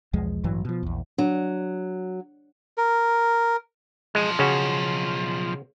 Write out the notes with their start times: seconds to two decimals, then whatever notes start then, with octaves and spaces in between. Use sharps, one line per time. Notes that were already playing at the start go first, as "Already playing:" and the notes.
0.13 B1 E2 F3 G#3
0.44 A1 G2 E3 F#3
0.65 B2 F3
0.83 A#1 E2
1.18 F#3 D4
2.78 A#4
4.15 B1 F3 G#3
4.39 C#3 C#4 F#4